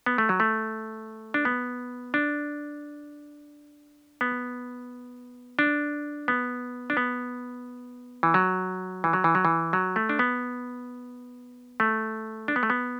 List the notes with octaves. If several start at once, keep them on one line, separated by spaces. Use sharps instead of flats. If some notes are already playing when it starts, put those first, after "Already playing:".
B3
A3
F#3
A3
D4
B3
D4
B3
D4
B3
D4
B3
E3
F#3
E3
F#3
E3
F#3
E3
F#3
A3
D4
B3
A3
D4
B3
A3
B3